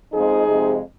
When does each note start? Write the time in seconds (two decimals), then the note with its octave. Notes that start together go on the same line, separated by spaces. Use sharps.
0.13 F2 F3 G#3 D#4 G#4
0.47 F2 C3 G#3